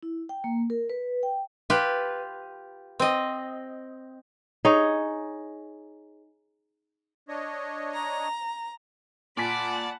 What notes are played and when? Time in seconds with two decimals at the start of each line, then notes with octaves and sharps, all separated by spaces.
0.03 E4
0.29 G5
0.44 A#3
0.70 A#4
0.90 B4
1.23 G5
1.70 F4 G4 B4
2.99 C4 D#5
4.65 D#4 G#4 C#5
7.28 D4 C#5 D#5
7.93 A#5
9.37 A#2 D5 F#5 G#5 A5 B5 B6